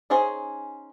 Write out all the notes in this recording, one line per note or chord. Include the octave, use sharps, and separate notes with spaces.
C#4 D#4 G#4 C5 G#5